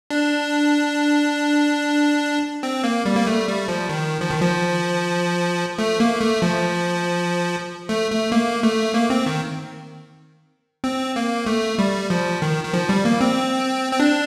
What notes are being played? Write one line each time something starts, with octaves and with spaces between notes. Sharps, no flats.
D4
C4
A#3
G3
A#3
A3
G3
F3
D#3
F3
D#3
F3
A3
A#3
A3
F3
A3
A3
A#3
A3
A#3
C4
D#3
C4
A#3
A3
G3
F3
D#3
D#3
F3
G3
A#3
C4
C4
D4